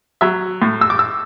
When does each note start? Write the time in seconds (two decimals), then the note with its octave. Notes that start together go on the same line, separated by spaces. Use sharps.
0.21 F#3 E5
0.62 A2
0.81 E6
0.90 D6
0.99 E6